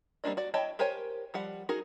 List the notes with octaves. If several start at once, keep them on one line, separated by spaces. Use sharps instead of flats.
G3 A#3 C4 D4 D#5
F#4 D5
E4 C#5 D#5 G5 A5
G4 A#4 C5 C#5 G#5
F3 G3 F#5
D#4 F#4 G#4 A#4